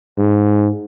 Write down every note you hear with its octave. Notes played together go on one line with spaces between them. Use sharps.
G#2